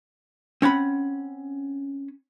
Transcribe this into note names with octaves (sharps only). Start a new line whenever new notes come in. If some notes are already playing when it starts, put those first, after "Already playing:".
C4 C#4 F#5 B5